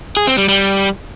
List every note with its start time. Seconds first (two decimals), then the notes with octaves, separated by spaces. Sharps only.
0.17 G#4
0.27 C4
0.38 G3
0.48 G3